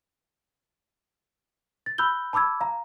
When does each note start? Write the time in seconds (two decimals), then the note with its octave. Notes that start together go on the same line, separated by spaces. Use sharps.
1.86 A6
1.98 B5 E6 F#6 G6 G7
2.33 A5 B5 D6 E6 G#6
2.61 F5 A#5